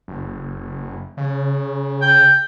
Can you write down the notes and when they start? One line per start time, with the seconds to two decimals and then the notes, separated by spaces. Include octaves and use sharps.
0.08 F#1
1.17 C#3
2.02 G5